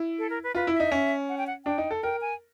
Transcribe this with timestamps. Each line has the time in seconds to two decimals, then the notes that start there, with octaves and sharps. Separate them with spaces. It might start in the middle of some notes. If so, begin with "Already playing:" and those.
Already playing: E4
0.18 A4
0.30 A#4
0.43 B4
0.55 F4 B4
0.67 E4
0.74 E5
0.80 D#4
0.92 C#4
1.29 F#5
1.38 G5
1.47 F#5
1.65 D4 G5
1.78 D#4
1.91 A4
2.03 A#4 G5
2.21 G#5